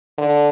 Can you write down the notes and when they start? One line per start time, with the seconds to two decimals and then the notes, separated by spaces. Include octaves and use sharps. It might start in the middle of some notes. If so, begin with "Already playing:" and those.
0.18 D3